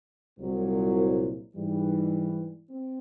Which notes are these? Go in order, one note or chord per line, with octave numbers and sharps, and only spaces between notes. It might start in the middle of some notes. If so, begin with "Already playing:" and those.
C2 A#2 F#3
G#2 E3 G3
C4